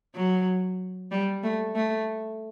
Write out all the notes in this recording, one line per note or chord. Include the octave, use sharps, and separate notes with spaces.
F#3
G3
A3
A3